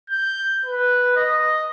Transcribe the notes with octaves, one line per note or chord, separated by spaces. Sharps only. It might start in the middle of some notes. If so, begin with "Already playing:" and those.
G6
B4
D#5